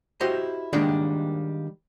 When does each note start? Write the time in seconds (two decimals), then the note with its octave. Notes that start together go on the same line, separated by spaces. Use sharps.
0.20 E4 F#4 G4 C5 D#5
0.73 D#3 G3 G#3 A#3 D4 D5